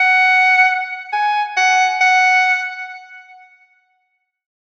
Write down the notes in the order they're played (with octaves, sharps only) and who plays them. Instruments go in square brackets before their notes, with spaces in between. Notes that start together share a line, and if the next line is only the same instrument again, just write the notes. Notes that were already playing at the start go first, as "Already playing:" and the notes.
Already playing: [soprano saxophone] F#5
G#5
F#5
F#5